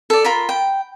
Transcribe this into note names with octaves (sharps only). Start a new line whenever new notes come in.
A4 D5
F4 A#4 B5
G5